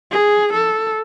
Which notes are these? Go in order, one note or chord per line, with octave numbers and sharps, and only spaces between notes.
G#4
A4